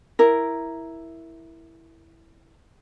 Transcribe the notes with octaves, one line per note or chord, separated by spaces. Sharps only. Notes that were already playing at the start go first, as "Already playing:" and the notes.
E4 A#4